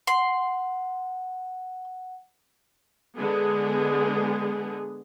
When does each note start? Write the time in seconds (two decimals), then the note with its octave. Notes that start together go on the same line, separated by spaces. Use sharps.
0.07 F#5 C6
3.16 D3 G#3 B3 G#4